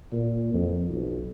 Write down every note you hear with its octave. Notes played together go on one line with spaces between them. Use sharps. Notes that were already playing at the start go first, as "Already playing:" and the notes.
A#2
F2
B1